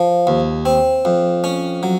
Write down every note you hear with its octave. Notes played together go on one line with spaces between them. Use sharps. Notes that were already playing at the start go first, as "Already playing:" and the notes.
Already playing: F3
D#2
C4
F2
C#4
F#3